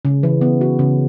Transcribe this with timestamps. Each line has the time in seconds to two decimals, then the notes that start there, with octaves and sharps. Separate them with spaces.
0.05 C#3
0.23 E3
0.41 B3
0.61 F#4
0.79 C#3